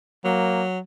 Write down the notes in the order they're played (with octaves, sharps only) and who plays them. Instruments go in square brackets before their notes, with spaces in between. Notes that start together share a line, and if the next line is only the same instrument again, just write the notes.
[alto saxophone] F#3 [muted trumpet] A#3